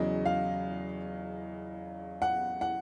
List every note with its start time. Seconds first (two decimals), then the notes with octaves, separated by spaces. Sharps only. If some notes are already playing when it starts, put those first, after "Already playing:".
Already playing: E2 C#3 F#3 D#5
0.25 F5
2.22 F#5
2.61 F#5